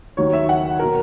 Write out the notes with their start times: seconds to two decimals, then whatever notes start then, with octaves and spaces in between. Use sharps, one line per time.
0.17 D#2 D#3 F#3 C#5
0.33 E5
0.49 F#5
0.79 B2 F#3 A#4